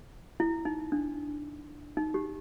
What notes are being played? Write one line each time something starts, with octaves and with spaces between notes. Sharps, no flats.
E4
D#4
D4
D#4
G4